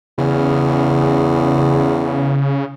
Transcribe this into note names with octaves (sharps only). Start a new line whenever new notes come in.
E2 C#3